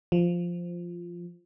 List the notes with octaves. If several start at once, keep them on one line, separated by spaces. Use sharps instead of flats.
F3